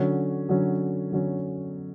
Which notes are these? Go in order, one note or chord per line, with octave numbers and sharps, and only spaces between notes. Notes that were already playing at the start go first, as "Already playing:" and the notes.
Already playing: D3 F#3 C#4
D3 F#3 C#4
D3 F#3 C#4